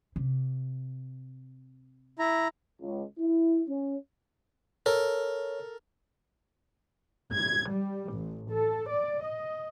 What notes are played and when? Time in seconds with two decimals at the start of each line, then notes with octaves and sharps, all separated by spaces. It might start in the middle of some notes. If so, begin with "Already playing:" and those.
0.16 C3
2.19 E4 A#5
2.82 C#2
3.20 E4
3.69 C#4
4.86 A4 A#4 C#5
7.33 G#6
7.70 G3
8.12 A1
8.50 A4
8.90 D5
9.22 D#5